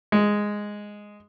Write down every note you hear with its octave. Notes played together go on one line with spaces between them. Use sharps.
G#3